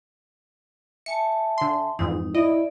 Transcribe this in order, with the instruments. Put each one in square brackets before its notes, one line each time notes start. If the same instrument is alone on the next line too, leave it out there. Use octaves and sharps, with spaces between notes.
[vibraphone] E5 G#5 A5 [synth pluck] C#7
[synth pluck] D3 C6
[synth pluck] F2 G#2 E3 [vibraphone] D#4
[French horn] E4 [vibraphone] D5 [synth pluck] D#5